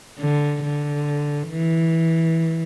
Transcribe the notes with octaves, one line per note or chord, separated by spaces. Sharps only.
D3
D3
E3